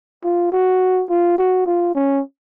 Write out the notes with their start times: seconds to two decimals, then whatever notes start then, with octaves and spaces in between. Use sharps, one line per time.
0.24 F4
0.52 F#4
1.10 F4
1.38 F#4
1.66 F4
1.95 C#4